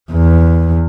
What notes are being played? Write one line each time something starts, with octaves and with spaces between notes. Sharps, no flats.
E2